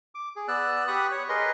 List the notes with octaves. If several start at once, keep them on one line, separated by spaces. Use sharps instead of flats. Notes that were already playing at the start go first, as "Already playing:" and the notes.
D6
G#4
B3 D5 E6 F#6
G4 B5 C#6 D#6 F#6
C#5
G#4 A#4 B4 D#5 C6